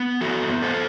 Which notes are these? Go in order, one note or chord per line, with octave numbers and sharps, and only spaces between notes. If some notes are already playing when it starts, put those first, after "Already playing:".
Already playing: B3
E3 F#4 A4
B3
A4 C5